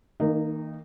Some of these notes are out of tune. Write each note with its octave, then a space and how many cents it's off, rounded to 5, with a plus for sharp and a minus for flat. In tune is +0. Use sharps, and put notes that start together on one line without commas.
D#3 +35 A#3 -25 D#4 -20